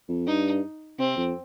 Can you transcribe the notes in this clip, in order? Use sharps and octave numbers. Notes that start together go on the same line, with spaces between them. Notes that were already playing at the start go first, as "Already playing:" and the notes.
F2
G2 D#4
C3 C4
F2